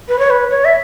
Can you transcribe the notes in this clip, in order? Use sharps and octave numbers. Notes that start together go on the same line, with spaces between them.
B4
C#5
B4
C#5
E5